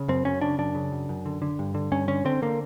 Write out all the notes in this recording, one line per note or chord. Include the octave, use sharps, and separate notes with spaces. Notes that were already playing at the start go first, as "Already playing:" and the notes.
Already playing: C#3
F#2 C4
F#2 C#4
C#3 D4
F#2 D4
C#3
F#2
F#2
D3
D3
G2
D3
G2 C#4
D3 C#4
D3 C4
D3 A#3